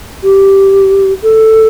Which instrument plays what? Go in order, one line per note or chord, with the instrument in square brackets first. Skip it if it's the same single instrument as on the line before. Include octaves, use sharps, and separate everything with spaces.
[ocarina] G4
A4